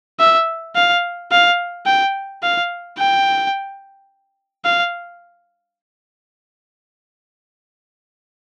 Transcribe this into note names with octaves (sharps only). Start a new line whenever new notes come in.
E5
F5
F5
G5
F5
G5
F5